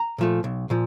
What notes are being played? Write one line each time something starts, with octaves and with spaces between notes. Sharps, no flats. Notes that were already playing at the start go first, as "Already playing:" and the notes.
Already playing: A#5
A#2 F3 A3
B1
A#2 F3